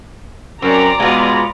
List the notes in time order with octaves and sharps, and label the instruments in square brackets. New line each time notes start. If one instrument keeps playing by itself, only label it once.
[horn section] F#2 [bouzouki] C4 [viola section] D5 A#5
[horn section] B2 G#3 [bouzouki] B3 F4